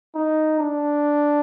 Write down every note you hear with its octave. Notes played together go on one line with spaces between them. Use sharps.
D#4
D4